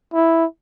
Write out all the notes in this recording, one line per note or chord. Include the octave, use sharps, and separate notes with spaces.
E4